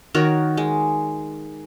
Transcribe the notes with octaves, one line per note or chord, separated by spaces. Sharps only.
D#3 F#4 A#4 C#5
G#3